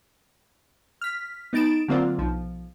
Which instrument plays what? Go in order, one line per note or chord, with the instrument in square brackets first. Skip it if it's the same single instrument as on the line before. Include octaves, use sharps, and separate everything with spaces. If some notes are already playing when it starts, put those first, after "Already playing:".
[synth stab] F6 B6
B3 D#4 A6 D7 E7
D3 F#3 A#3 C4 D4 F4
B1 F3